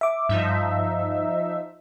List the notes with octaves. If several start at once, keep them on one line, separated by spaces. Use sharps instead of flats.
E5 D6
G2 F3 D#4 E5